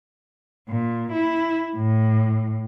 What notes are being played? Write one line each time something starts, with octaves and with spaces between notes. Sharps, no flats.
A#2
E4
A2